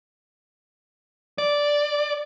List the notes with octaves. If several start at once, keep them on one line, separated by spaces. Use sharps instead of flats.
D5